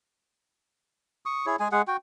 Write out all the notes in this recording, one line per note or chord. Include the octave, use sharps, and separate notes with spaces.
C#6 D#6
E4 G#4 C#5
G#3 G#4 G#5
G#3 G#4 F#5
F#4 G5